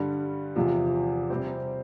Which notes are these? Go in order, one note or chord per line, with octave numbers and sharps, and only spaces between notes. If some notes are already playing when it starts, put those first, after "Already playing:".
Already playing: G2 D3 G3
E2 C3 F3
C3 G3 C4 G4 C5